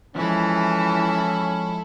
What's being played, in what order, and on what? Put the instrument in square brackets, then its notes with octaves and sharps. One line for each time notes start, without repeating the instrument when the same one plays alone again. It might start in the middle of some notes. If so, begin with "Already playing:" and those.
[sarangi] E3 [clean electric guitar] F3 G#3 [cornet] C#4 [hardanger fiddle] E4 A4